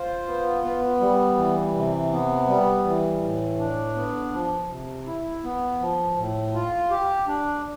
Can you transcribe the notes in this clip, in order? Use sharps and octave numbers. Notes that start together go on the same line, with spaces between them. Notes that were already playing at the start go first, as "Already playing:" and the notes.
Already playing: F4 C5
B3
B3
G3
E3
C3
B3
G3
E3
A2
D4
B3
F3
C3
E4
B3
F3
A2
F4
G4
D4